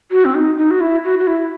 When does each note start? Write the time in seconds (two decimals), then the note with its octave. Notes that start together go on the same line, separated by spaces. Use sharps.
0.11 F#4
0.25 C4
0.35 D#4
0.58 D#4
0.71 F#4
0.81 E4
1.04 F#4
1.19 F#4
1.27 E4